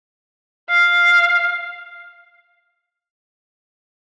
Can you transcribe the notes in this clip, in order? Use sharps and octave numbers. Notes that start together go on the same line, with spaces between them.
F5